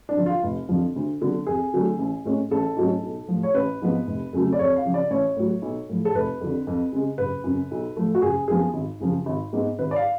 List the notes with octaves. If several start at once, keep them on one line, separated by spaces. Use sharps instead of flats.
D4
D3 F3
F4
F1
F2 D3 F3
D2
D3 F#3 B3
F2 G#4
D3 F#3 A3
A1
A2 G#3 C#4
A1 A4
G#2 F#3 A3 C#4
B1
A2 F3
C#5
A1 B4
G#2 F3 B3
F1
F2 C#3 F#3 A3
D5
F2 C#5
F5
C#3 F3
D5
A1 C#5
A2 F#3
B1
A2 F3
A4
F1 B4
F2 D3
F2
C#3 G#3
F#1 B4
F#2 C#3
B1
A2 F3 A3
F#4
F#1 G#4
F#2 F3 B3 G#4
G#1
F#2 C#3 F3
G#1
G#2 G#3 B3
G#1 B4
D5
F5